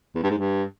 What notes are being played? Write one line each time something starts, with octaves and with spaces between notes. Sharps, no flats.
E2
G2
G#2
G2